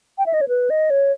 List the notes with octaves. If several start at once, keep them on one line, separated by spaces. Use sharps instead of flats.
G5
E5
D#5
C#5
B4
D#5
C#5